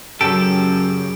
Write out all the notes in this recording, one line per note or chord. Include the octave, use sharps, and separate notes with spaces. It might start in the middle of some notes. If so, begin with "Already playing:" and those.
F#2 C#3 G4 A4 D7